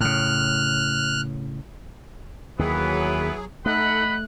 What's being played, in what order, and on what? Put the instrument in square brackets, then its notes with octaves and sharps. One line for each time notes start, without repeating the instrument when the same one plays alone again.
[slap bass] A2 C#3 [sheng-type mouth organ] F6 F#6
[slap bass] D#2 D#3 [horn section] E3 B3 B4 [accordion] F#3 G#4
[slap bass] A3 [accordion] D#4 A4 [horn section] D#5 F#5 B5 [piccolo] F#6